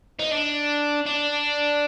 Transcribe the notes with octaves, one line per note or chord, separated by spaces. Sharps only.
D#4
D4
D4